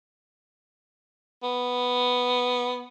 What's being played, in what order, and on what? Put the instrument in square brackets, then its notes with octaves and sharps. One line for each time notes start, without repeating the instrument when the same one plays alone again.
[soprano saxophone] B3